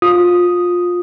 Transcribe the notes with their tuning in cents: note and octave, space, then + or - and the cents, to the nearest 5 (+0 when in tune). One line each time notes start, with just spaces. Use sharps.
F4 +20 D#6 +0